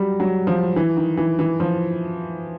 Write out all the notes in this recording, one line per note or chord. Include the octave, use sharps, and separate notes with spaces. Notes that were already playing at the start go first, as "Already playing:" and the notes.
Already playing: F#3 G3
F#3
F3
E3
D#3
E3
E3
F3